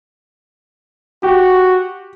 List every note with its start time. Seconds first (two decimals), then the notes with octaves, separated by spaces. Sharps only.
1.23 F#4 G4